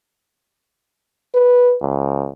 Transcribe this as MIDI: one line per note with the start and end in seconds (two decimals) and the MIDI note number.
1.34 1.76 71
1.82 2.31 37